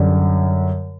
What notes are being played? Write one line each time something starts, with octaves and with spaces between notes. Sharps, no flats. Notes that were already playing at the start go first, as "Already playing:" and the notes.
Already playing: F#2 D3 G3